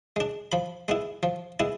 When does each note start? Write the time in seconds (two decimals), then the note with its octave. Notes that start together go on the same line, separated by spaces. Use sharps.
0.16 G#3 D4
0.52 F3 B5
0.88 G#3 B3 E4
1.23 F3
1.60 G#3 B3 E4